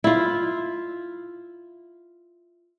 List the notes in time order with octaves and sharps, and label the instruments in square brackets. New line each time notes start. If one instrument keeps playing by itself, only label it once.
[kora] E4 F4